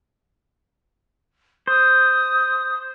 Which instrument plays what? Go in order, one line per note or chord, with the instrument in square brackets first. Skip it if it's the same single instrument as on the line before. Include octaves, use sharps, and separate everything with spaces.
[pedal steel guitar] C5 [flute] D#6